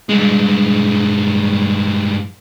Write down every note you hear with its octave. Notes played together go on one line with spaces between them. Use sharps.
G2 G#3